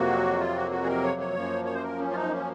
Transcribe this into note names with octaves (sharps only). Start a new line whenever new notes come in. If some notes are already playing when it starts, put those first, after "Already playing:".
Already playing: F2 C3 F#3 A#3 F#4
F4
F#4
F#4
G#4
A#4
C#5
C#5
F#2 F3 A#3
C#5
C5
A#4
C#4
F4
D#4
C#4